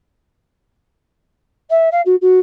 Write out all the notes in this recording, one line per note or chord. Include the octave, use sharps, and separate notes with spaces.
E5
F5
F#4
F#4